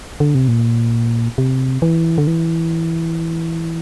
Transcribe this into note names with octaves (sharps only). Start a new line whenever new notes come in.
D3
C3
A#2
C3
E3
D3
E3